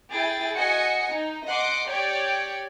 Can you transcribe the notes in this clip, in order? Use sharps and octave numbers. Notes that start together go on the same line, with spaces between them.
E4 G#4 G5 A6
F#4 D#5 G#5 C#7
D#4
D#5 F#5 C6 D6
G4 C#5 D5 G5